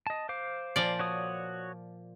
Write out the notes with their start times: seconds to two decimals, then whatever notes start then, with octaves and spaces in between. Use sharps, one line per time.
0.07 D#5 A5
0.29 C5 F5 D6
0.76 A#2 F3 D5
0.99 F#4 C#5 D#6